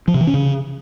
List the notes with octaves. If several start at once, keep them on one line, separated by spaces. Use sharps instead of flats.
F3
C3
E3
C#4
C#3